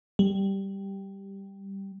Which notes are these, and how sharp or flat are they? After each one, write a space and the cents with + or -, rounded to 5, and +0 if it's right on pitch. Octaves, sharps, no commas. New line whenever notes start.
G3 +0